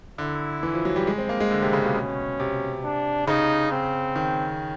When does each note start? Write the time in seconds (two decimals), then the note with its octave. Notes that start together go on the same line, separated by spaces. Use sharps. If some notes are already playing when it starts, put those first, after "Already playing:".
0.18 D3 E4
0.63 E3
0.74 F3
0.85 F#3
0.96 G3
1.07 G#3
1.18 C4
1.29 A#3
1.40 G#3
1.51 D3
1.62 C3
1.73 C#3
1.84 B2
1.95 C#4
2.40 C3
2.84 D4
3.27 C#3 D#4
3.72 C4
4.16 D#3